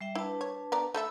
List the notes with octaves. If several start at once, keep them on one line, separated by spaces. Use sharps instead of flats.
G3 E5 G5
D4 E4 B4 A5
C#5
B3 D5 A#5
A3 A4 E5 B5 E6